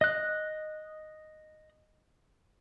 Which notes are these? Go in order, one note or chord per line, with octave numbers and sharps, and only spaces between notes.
D#5 F#6